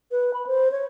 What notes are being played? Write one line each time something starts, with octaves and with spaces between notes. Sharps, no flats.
B4
B5
C5
C#5